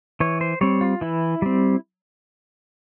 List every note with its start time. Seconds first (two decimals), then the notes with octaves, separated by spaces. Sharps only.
0.20 E3 C#5
0.41 C5
0.61 G3 C4 C#5
0.81 F4
1.01 E3 E4
1.42 G3 C4